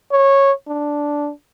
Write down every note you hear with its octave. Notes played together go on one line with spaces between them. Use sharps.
C#5
D4